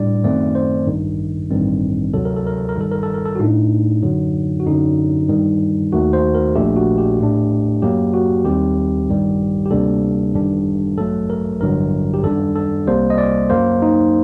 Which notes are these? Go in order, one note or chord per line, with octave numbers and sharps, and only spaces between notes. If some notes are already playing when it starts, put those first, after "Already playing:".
Already playing: A2 G3 D4 D5
F#2 D#3 A3 C4 D5
C5
A1 G2 D#3
A1 G2 D#3 G3 C4
D2 C3 F#3 A4
A#4
A4
A#4
A4
A#4
G1 G2 D#3 G3 A4
A#4
A4
A#4
A4
F#4
A2 A3 D4 D#4
F#2 D3 F#3
F#4
F#2 D3 F#3 D#4
G2 D#3 G3
D#2 D#3 A3 F#4
C5
A#4
A#1 A#2 A3 D4 G4
F#4
G4
A2 A3 D4
F#2 F#3 A#3 G4
F#4
D#2 D#3 G3 C4 G4
A1 G2 D#3 G3
G4
D2 C3 G3 A#3 D4 A4
G1 F#2 D#3 G3 D4
A1 G2 F#3 A3 A4
A#4
A1 G2 D3 F#3 A#4
G4
F#2 D#3 G3 D4 A4
A4
C2 C3 G3 A#3 C5
D#5
D5
F#2 F#3 A#3 C5
D#4